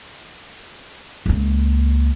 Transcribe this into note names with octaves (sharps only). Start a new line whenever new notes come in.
C#2 A#3